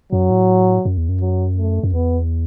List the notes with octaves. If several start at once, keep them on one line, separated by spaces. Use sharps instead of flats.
F#2 F#3
A2
F#2
E2
F#2
F#3
A3
F#2
E2 B3